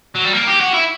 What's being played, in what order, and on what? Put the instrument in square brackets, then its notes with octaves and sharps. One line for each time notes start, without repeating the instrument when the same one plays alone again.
[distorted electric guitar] F#3
G3
A#3
G4
F#4
E4